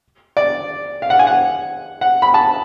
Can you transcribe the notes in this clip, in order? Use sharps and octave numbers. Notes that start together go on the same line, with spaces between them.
D5
F5
F#5
G#5
F#5
F#5
B5
A5